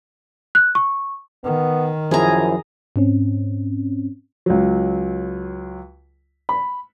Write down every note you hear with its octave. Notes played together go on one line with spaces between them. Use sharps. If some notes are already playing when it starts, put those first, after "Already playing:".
F#6
C#6
D#3 B3
F#2 F3 E4 G#4 A#5
G#2 C4 C#4
C#2 F#3
B5